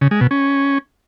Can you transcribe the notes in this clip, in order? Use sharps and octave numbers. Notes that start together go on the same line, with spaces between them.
C#3
G#3
B2
C#4